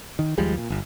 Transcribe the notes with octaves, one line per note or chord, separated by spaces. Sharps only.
D#3
D#2 F3 G3 G#3
A#2
G1